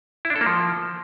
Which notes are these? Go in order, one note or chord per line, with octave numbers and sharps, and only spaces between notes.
E4
D4
A4
A#3
F3